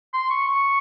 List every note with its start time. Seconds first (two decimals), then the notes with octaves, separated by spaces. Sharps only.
0.13 C6
0.30 C#6
0.48 C#6